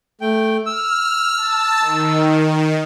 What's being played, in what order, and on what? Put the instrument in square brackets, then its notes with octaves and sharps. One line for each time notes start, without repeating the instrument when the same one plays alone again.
[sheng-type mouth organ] A3 G5
[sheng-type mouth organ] E6 [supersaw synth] F6
[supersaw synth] A5
D#3